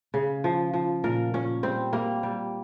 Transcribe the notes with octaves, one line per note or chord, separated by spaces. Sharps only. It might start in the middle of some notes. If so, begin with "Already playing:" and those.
C#3
F3
F3
A#2 A#4
A#2 C#4
G3 C4
G3 A#3
G3